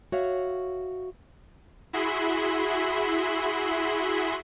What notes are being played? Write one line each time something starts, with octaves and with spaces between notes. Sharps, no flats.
F#4 C#5 E5 F5
E4 F#4 G#4 E5 B5 C6